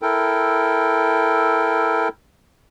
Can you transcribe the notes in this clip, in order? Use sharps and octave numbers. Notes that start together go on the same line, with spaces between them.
E4 A4 A#4 G5